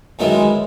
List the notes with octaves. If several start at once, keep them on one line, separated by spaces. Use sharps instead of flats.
F#2 D#3 F#3 G#3 B3 E4